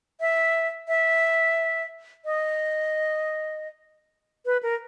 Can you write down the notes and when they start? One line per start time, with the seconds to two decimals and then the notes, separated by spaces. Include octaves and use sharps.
0.20 E5
0.88 E5
2.25 D#5
4.46 B4
4.63 A#4